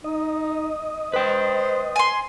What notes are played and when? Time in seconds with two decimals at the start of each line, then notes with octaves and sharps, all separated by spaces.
0.04 D#4 D#5
1.13 B4 C5 G5
1.96 G#5 C6